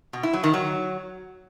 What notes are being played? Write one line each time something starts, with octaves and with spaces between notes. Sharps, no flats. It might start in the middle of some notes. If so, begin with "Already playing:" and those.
B2
E4
F#3
D#3
F#3